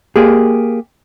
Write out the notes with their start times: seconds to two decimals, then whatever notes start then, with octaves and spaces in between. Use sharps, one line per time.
0.16 A#3 G4 G#4